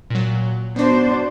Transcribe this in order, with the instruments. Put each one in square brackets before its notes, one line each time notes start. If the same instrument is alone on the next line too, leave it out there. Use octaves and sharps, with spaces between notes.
[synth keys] A#2 F#3
[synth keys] B3 F#4 [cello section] D4 C5